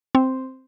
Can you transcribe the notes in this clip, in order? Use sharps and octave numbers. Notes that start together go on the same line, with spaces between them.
C4